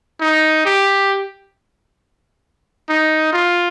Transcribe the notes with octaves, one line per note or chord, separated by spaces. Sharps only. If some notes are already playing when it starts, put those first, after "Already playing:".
D#4
G4
D#4
F4